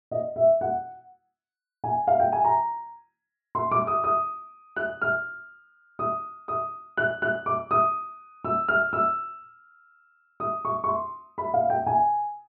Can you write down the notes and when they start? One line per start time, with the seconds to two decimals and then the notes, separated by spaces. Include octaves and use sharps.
0.11 D#5
0.36 E5
0.61 F#5
1.84 G#5
2.07 F5
2.20 G5
2.32 G#5
2.44 A#5
3.55 C6
3.71 D6
3.87 D#6
4.04 D#6
4.76 F#6
5.01 F6
5.99 D#6
6.48 D#6
6.97 F#6
7.22 F#6
7.46 D6
7.71 D#6
8.45 E6
8.68 F6
8.93 E6
10.40 D#6
10.65 C#6
10.84 C#6
10.88 C6
11.38 B5
11.54 F5
11.70 G5
11.86 G#5